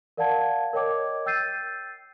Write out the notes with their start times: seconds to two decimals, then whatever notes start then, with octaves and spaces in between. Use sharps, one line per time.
0.17 A#4 D5 F5 F#5 A5 G#6
0.73 A#4 C#5 D#5 G5 D6 G#6
1.26 G5 E6 G6 A6 C7 D#7